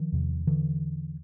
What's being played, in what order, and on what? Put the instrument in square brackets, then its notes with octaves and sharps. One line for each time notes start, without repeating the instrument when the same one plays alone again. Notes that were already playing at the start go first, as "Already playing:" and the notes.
Already playing: [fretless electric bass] D#3 F3
E2 C3
D3 E3